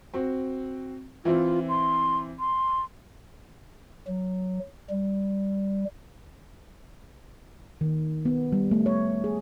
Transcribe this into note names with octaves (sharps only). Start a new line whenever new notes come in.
C4 F#4
E3 C4 E4 F4
C6
C6
F#3
G3
D#3
B3
G3
A3
C#5
G#4